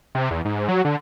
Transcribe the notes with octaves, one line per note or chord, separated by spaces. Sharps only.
C3
E2
G#2
F#3
D3